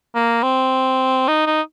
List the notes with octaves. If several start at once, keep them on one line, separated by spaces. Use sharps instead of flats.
A#3
C4
D#4
D#4